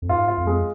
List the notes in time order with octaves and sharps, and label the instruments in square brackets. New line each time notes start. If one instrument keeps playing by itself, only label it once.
[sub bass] F2
[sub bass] G#2 [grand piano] F4
[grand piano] F4
[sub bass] F2
[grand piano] G#3